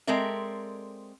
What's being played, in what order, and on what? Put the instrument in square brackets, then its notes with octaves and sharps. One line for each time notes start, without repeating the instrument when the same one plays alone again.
[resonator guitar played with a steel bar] G#3 C4 A4 A#4 D5 E5